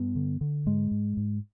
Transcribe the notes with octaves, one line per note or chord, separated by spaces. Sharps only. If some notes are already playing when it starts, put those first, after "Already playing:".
Already playing: G2 B3
D3
D3
G#2 G#3
G#2
G#2